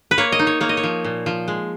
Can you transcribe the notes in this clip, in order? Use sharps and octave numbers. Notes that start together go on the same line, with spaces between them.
B4
A#3 C#5
D#5
D#4
C#5
A#3 C#5
D#5
C#5
F3
A#2
F3
G#3